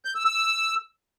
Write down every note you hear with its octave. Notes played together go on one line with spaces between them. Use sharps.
G6
E6
E6